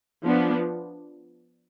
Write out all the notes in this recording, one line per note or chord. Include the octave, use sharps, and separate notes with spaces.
F3 B3 D4